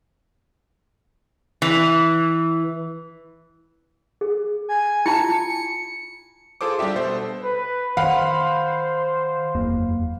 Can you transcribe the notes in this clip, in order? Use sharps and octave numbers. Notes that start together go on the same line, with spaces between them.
E3
G#4
G#5
E4 F4 A5 C#7
F4 G#4 A4 C5 D6
G3 D4 G4 E5
B2 A4 C5
B4
D#3 C5 F5 F#5 B5
F#1 E2 A#3